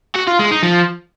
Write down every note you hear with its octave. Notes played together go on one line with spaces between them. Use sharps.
F#4
F4
G#3
D#4
F3